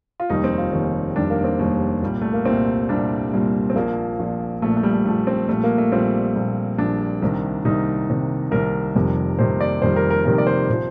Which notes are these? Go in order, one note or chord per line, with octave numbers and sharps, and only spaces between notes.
F4
F1 D#2 D#3 G3 D#4
C4
F4
F1 D#2 D#3 G3
F1 D#2 D#3 G3 D4
A#3
C4
F1 D#2 D#3 G3
C2 A#2 G3
A3
A#3
C2 A#2 G3 C4
C2 A#2 G3 D4
C2 A#2 G3
C4
A#1 A#2 F3 A#3
A#1 A#2 F3
A#1 A#2 F3 A3
A3
G3
A3
A#1 A#2 F3 A3
C4
A#1 A#2 G3 A3
A#3
A3
A#1 A#2 G3 C4
A#1 A#2 G3
A#1 A#2 G3 D4
C2 C3 D#3
C2 C3 D#3 D#4
C2 C3 D#3
C2 C3 D#3 A#4
F1 F2 C3 D#3 G3
F1 F2 C3 D#3 G3 C5
D5
F1 F2 C3 D#3 G3 C5
A#4
A#4
F1 F2 C3 D#3 G3 A#4
D5
C5
C3 F3